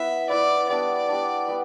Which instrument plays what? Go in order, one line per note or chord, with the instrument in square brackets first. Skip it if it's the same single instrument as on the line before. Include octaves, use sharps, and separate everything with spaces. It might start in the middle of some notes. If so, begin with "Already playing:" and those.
Already playing: [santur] B3 E4 B4 [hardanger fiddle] E5
[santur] B3 E4 B4 [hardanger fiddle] D5
[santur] G3 B3 D4 [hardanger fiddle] D5
[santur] G3 B3 D4
G3 B3